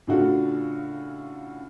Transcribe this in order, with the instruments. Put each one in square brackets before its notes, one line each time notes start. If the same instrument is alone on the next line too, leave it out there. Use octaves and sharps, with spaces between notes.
[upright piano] A2 C#3 D4 F4 F#4 A4